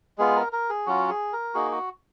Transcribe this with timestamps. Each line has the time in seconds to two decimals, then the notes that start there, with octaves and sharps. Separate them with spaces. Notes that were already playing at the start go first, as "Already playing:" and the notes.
0.18 G#3 B3 F4 G#4
0.36 A#4
0.53 A#4
0.70 G#4
0.86 F#3 C#4 F4 F#4
1.10 G#4
1.33 A#4
1.54 A#3 D#4 F#4 G#4
1.71 F#4